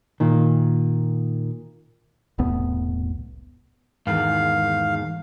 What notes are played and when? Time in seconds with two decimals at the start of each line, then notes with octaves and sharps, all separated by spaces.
0.20 A#2 D#3
2.38 E1 C2 A2 B3
4.07 E2 G#2 D#3 F5